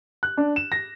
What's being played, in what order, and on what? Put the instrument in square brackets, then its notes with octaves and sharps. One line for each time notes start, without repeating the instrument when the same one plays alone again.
[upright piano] F#6
D4
E7
A#6